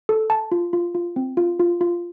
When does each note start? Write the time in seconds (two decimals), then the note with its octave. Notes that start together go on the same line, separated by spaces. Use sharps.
0.09 A4
0.30 A5
0.52 F4
0.73 F4
0.95 F4
1.16 C4
1.37 F4
1.60 F4
1.81 F4